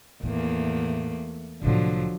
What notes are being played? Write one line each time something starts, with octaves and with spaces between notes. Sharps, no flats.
E2 A2 D#3 A3 A#3
C2 A2 D3 F3 F#3